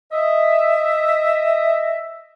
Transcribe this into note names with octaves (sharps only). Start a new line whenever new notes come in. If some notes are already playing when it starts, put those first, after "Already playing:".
D#5 E5